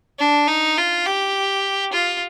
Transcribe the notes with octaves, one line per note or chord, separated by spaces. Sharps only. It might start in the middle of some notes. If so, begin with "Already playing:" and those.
D4
D#4
F4
G4
F4